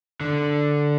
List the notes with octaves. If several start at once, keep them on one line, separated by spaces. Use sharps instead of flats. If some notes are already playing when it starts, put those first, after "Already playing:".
D3